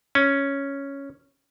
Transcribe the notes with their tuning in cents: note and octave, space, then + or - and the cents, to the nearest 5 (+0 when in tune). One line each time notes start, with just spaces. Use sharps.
C#4 +0